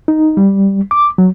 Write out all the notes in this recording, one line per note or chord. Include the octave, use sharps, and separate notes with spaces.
D#4
G3
D6
F#3